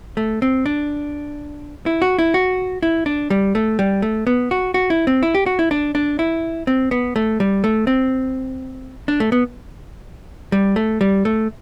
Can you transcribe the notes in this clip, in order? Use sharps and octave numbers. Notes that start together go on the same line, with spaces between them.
A3
C4
D4
E4
F#4
E4
F#4
E4
D4
G3
A3
G3
A3
B3
F#4
F#4
E4
C4
E4
G4
F#4
E4
D4
D4
E4
C4
B3
A3
G3
A3
C4
D4
A3
B3
G3
A3
G3
A3